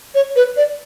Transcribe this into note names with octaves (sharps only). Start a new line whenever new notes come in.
C#5
B4
D5